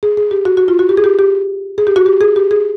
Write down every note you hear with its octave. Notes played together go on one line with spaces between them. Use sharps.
G#4
G#4
G4
F#4
F#4
F4
F#4
G4
G#4
G4
G4
G#4
G4
F#4
G4
G#4
G4
G#4